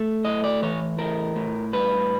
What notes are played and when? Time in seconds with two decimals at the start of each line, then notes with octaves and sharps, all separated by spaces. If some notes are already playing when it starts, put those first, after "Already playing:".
Already playing: A3
0.25 A2 D#5
0.44 D5
0.62 E3 C#5
0.98 A2 A#4
1.36 A2
1.73 G2 B4